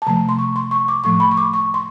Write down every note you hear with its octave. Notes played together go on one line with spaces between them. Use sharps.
A5
C3 F3 A3 A#5
C6
C#6
C6
C#6
D6
A2 F3 A3 C#6
B5
C#6
D6
C#6
C6